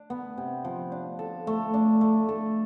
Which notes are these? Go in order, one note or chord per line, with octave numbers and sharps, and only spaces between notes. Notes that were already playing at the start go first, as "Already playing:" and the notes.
Already playing: D4
B3
C3
F3
D4
A4
A3
D4
A3
A4